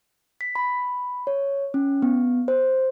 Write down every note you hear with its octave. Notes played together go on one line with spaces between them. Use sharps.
B6
B5
C#5
C#4
B3
C5